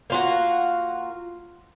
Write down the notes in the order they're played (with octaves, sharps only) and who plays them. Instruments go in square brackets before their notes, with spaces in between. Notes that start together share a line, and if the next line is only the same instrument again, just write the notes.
[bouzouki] A#3 F4 F#4